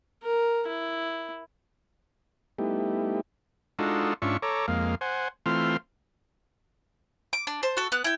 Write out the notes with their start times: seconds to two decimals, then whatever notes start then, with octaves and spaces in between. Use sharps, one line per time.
0.23 A#4
0.68 E4
2.59 G3 A3 B3 D#4 E4 G4
3.79 G#3 D4 D#4 F4 F#4 A4
4.22 G#2 C#4 D4 F4 E5 C#6
4.42 A4 C#5 A#5 D6
4.68 F2 G#3 A#3 F5
5.01 C5 F#5 G#5
5.46 E3 A3 C4 F4 C6 F6
7.33 D6
7.47 D4
7.63 C5 A5
7.77 F#4 A4
7.92 B3 F#6
8.04 E4 G5